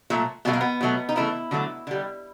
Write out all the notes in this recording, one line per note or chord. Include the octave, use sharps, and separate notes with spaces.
A#2 F#3 A3
B2 F#3 A3 B3
A#3
B3
B2 F#3 A3
D#4
C#3 E3 A3 E4
D3 F#3 A3
D3 G3